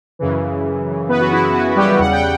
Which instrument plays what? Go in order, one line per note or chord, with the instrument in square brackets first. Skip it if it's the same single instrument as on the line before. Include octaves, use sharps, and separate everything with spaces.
[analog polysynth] F#2 C#3 E3
B3 B4
F#4
E4
E4
F#4
G3 G4
E2 C#3 G3 F#5
G5